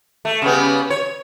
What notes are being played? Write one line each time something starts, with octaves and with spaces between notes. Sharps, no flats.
A3
C#3 G3 B3
C#5